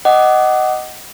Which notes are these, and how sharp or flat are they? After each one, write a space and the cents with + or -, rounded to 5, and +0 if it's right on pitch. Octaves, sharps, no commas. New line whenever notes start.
D#5 +0 F#5 +20 D6 +0